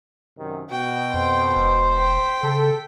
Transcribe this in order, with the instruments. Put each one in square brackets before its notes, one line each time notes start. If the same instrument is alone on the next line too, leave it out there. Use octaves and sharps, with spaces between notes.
[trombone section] F#2 C3 D#3
[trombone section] B2 [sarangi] F#4 [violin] G5
[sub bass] F2 [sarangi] C5
[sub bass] E1
[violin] G5 B6
[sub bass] C#3 [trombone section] A4